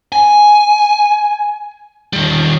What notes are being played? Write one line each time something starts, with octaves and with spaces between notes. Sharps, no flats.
G#5
D#3 G3